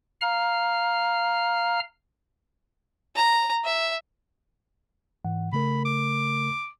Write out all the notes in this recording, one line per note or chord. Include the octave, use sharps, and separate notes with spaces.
F5 A#5 F6
A#5
E5
G#2 E3 F#5
C#3 A3 A#4 B5
D6